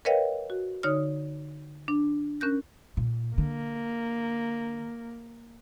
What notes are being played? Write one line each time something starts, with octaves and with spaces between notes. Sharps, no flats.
A#4 B4 C#5 D#5 F5 G5
F#4
D3 D#4 C#5 D#6 F6
D4
C#4 A#4 F#6 G6 A#6
A#2
D3 A#3